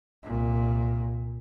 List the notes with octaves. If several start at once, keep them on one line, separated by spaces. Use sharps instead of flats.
C2 A#2